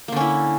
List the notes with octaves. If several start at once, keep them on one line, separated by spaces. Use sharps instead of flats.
D3 A#3 C#4 E4